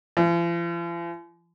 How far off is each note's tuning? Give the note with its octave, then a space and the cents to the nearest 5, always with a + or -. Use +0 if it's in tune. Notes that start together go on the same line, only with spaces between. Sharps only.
F3 -45